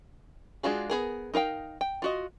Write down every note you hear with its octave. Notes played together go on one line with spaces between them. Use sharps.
G#3 D4 F4 F#4 G#4
B3 G#4 A#4
D#4 A#4 F5 G5
G5
F4 F#4 D#5